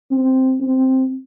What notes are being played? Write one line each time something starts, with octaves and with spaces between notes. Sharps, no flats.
C4
C4